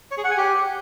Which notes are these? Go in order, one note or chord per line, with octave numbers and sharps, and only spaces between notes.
C#5
G#4
F#5
G#5
G4